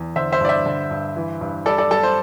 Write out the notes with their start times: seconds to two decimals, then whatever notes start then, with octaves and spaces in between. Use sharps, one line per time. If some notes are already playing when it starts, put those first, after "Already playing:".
Already playing: E2
0.16 D3 C5 E5
0.32 C5 E5
0.41 G2 D5
0.49 C5 E5
0.66 D3
0.91 G2
1.16 E3
1.41 G2
1.66 G3 A4 D5
1.78 A4 D5
1.91 G3 A4
2.03 C5